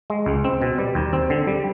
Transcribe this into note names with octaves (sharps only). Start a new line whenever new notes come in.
G#3
C#2
C4
B2
G3
D#2
C4
D3
G3